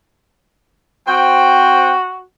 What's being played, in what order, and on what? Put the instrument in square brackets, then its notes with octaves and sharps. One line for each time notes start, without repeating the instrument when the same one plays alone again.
[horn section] C4 C5 G5 [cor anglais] F#4